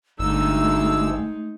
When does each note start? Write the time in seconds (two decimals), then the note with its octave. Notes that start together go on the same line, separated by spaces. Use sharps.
0.19 G1 D2 G#3 A3 D#4 E6